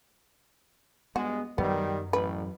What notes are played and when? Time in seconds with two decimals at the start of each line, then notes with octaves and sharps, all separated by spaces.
1.16 G2 G#3 B3 F#4
1.58 F#2 D#3 F#3 G3 B3
2.13 A1 B4